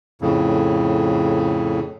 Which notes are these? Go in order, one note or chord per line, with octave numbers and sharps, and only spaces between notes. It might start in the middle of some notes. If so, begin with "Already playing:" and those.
F2 A2 C#3